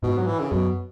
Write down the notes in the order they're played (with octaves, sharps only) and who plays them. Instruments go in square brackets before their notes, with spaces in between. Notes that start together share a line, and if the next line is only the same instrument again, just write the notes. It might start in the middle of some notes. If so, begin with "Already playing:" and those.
[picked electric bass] G#2 [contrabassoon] B2
[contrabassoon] F#3
E3
C#3
[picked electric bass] F#2 [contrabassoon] B2